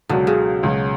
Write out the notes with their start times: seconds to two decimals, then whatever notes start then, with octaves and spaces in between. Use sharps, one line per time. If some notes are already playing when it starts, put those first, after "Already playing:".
0.09 C#2 B2 D3 F#3
0.27 C#3
0.63 C#2 B2 F#3